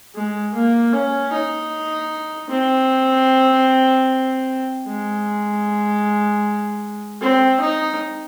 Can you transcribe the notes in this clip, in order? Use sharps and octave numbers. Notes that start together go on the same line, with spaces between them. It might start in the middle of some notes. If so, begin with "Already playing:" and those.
G#3
A#3
C#4
D#4
C4
G#3
C4
D#4